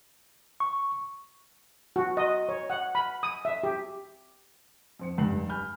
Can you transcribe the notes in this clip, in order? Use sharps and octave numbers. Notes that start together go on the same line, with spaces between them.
C#6
F#4
D#5
C#5
F#5
B5
D#6
E5
G4
F2 C4 C#7
F1 G2 C7 F#7
G#5 B5 F6 G6